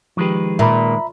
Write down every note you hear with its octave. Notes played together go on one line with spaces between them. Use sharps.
D#3 F3 G#3 G4 B4
A#2 E5 A#5 B5